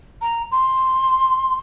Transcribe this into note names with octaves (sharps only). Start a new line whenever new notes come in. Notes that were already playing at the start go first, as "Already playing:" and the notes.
A#5
C6